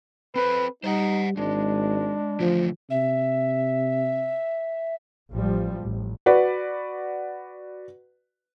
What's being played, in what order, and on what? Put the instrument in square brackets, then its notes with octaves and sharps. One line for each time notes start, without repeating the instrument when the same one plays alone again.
[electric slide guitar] C4 A4 C5 [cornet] B4
[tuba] G3 [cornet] D#4 [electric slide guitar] C5 D#5 F#5
[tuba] G#1 [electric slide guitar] G#3 [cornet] D4
[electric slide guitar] D3 E3 A3 [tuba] F3
[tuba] C3 [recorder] E5
[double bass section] A1 F3 G3
A1
[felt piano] F#4 B4 D5